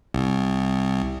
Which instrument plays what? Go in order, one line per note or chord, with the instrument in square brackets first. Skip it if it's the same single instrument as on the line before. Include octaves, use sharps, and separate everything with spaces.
[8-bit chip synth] C2